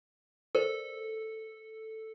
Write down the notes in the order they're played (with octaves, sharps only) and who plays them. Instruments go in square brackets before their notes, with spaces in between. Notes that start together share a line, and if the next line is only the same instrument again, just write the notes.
[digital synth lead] A4 [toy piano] A#4 C5 D5